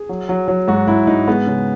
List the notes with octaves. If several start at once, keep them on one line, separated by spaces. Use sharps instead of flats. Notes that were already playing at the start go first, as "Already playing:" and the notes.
Already playing: G#4
F#3
F#3
F#3
G#2 F#4
G#2 E4
G#2 D#4
G#3 B3
C#3